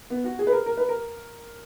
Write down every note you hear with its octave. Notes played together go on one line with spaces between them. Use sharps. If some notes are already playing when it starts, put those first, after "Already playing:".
B3
F#4
G#4
B4
A#4
A#4
B4
A#4